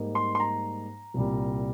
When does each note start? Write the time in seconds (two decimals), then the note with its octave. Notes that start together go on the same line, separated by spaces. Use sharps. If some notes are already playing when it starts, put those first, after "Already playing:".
Already playing: G#2 G3 A#3 D#4
0.15 C6
0.35 C6
0.40 A#5
1.14 C2 A#2 G3